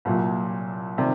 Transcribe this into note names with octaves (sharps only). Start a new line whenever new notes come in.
C2 A#2 F#3
C3 D#3 G3 C4